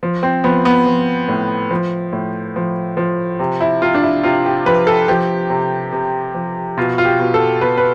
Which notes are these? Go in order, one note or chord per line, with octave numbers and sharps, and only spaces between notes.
F3
C4
F3 B3
B3
F3
A2
F3
A2
F3
F3
C3
E4
C3 F4
D4
E4
C3 F4
G4
F3 B4
A4
F3 G4
C3
C3
F3
B2 F4
F4
G4
B2
A4
B2 B4
B4